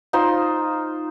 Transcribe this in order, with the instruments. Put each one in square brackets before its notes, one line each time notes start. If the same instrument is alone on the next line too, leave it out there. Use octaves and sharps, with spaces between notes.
[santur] D#4 F4 C5 C6